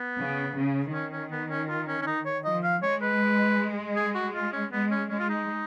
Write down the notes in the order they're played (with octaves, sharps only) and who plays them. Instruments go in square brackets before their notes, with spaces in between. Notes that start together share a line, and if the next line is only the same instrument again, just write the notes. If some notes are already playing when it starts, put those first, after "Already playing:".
Already playing: [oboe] B3
[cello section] C#3
C#3
[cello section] D#3 [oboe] C#4
[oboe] C#4
B3
C#4
F4
C#4
C#4
D#4
C#5
[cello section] F3 [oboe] D#5
[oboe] F5
[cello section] G#3 [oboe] C#5
[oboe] B4
G#4
F#4
F4
C#4
[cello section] G#3 [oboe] B3
[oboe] C#4
[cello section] G#3 [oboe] C#4
[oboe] F4
D#4